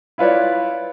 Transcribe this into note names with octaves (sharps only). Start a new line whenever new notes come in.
E4 F4 B4 C#5 D5